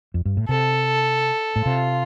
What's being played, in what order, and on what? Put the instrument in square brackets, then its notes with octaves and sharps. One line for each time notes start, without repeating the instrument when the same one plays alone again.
[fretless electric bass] F2
G2
A2
[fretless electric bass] C3 [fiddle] A4
[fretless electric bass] A2
[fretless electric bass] C3 [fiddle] F4